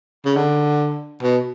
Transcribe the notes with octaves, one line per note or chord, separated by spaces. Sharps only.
C#3
D3
B2